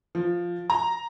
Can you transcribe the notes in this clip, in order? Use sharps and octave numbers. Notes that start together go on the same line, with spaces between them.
F3
A#5